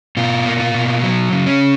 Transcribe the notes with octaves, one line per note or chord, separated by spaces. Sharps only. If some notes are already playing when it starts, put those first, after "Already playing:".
B2 F4
A#3
F4
B2
F#3
C#3
C#4